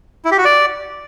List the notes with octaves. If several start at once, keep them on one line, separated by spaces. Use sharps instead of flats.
E4
G4
F#4
D5